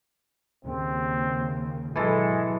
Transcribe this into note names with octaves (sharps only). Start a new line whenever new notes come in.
D#2 C#3 C4
G#1 B2 E3 F#3 G#3 A4